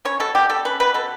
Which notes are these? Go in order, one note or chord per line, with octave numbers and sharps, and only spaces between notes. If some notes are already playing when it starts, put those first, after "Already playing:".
C#4 C#5
B2 A4
B2 G4
G3 A4
C#4 B4
B2 B4
B2 A4